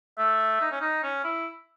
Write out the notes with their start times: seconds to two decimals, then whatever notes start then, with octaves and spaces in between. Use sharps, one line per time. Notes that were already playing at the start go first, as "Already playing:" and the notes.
0.18 A3 E5
0.61 D#4
0.71 C#4
0.81 D#4
1.03 C#4
1.24 E4